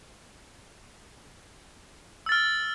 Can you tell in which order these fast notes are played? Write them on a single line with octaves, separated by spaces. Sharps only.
E6 A6 F6